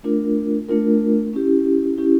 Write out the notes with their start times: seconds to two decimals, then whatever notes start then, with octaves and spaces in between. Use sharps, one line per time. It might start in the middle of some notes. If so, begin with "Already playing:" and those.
0.03 A3 D4 F4 A#4
0.69 A3 D4 F4 A#4
1.33 C#4 E4 G4
1.98 C#4 E4 G4